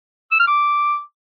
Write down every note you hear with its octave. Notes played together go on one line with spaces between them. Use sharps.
E6
F6
D6